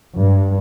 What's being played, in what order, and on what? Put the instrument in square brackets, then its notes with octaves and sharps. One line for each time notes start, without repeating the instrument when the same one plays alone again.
[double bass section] G2